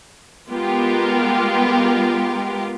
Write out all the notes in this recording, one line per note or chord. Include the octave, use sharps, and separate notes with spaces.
G#3 B3 F4 G4 A#4